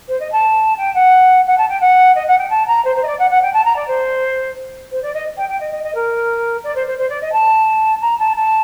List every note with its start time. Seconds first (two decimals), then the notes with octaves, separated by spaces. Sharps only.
0.08 C5
0.20 D#5
0.32 A5
0.77 G5
0.94 F#5
1.46 F#5
1.57 A5
1.69 G5
1.80 F#5
2.15 D#5
2.27 F#5
2.38 G5
2.50 A5
2.67 A#5
2.84 C5
2.95 C5
3.02 D#5
3.07 D5
3.18 F#5
3.30 F#5
3.42 G5
3.53 A5
3.65 A#5
3.76 D5
3.87 C5
4.91 C5
5.02 D5
5.14 D#5
5.37 G5
5.49 G5
5.60 D#5
5.71 D#5
5.83 D#5
5.94 A#4
6.63 D5
6.75 C5
6.87 C5
6.98 C5
7.09 D5
7.21 D#5
7.32 A5
8.01 A#5
8.19 A5
8.36 A5